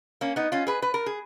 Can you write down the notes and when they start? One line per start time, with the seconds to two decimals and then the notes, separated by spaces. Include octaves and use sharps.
0.21 A#3 C#4
0.36 B3 D#4
0.52 C#4 F4
0.67 G#4 B4
0.82 B4
0.94 A#4
1.06 G#4